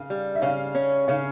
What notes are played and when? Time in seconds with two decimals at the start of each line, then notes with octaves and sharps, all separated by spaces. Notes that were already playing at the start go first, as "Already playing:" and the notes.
Already playing: C#3 F5
0.10 G3
0.35 E5
0.42 C#3 C#5 F5
0.75 C#4
1.08 C#3 C#5 F5